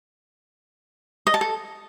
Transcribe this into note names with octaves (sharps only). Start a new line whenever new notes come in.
D#5
A5
A4